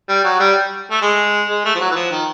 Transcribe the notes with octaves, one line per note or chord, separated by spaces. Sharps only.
G3
F#3
G3
A3
G#3
G#3
A3
F3
F#3
E3
F3
D#3